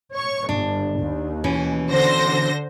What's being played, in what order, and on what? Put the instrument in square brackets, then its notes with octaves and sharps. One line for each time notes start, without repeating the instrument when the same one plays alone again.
[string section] C#5 C#6
[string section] G1 [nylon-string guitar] D4
[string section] D#2
[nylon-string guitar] B2 E3 C#4
[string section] D3 C5 A#6